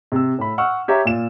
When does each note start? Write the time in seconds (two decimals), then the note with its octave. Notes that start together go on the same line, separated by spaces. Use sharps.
0.12 C3 E6
0.39 A2 B5
0.58 F#5 C#6 E6 F6
0.88 G4 C#5 E5 A#5
1.05 A#2 E7